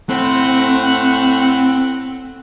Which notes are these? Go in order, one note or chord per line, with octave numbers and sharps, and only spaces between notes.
A2 C4 F#5